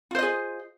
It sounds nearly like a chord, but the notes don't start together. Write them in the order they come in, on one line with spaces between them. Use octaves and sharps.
F4 C5 D#5 G#4